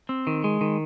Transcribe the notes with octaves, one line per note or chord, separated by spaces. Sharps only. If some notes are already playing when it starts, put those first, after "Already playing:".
C4
D#3
G#3
D#3